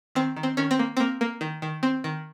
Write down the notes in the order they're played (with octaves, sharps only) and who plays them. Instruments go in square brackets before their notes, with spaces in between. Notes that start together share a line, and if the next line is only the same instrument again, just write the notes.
[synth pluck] D#3 C4
D#3
C4
D#3 C#4
C4
A#3
A#3 C4
A#3
D#3
D#3
C4
D#3